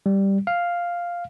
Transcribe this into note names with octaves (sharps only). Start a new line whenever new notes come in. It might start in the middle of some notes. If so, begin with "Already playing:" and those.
G3
F5